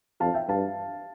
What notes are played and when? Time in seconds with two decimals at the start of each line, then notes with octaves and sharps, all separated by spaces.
0.20 F2 F5 A5
0.34 E5 G5
0.48 G2 F5 A5